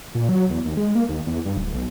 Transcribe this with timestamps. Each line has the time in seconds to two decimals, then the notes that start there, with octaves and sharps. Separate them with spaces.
0.15 A#2
0.29 F#3
0.50 E2
0.65 D#2
0.77 G#3
0.95 A#3
1.09 D#2
1.26 E2
1.45 G2
1.57 D1
1.75 B1